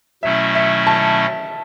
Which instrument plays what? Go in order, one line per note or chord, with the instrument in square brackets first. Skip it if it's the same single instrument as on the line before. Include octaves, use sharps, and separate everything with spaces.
[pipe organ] B2 F#3 A3 C#4 E4 [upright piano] E5
[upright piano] E5
A5